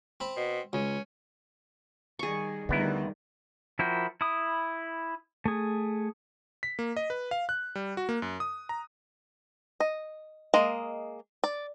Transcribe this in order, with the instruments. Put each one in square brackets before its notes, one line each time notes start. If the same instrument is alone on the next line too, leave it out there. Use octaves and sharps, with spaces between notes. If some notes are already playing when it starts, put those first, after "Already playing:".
[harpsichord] C4 B5
[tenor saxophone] B2
[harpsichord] C#2 [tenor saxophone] C#4
[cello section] D#3 G3 [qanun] G#4 C#6
[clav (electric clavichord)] D2 B3 E4 [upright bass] D3 [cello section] D#3 G3
[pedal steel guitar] F3 E4 F#4 A#4 G5
E4 B5 D#6
A3 G#4
[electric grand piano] B6
A#3
D#5
B4
F5
F#6
G3
F#4
A#3
F#2
D#6
A#5
[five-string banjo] D#5
G#3 A#3 D#5
D5